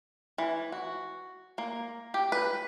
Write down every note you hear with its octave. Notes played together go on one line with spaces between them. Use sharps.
E3
F#4
A#3
G4
B4